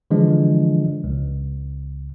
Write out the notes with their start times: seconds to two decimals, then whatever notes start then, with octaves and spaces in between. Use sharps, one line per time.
0.11 D3 E3 F3 G#3 D4
1.04 C#2